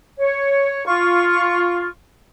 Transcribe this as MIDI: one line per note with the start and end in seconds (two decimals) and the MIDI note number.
0.18 0.85 73
0.85 1.85 65
0.85 1.85 85